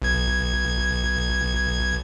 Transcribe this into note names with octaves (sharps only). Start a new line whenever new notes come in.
B1 G#6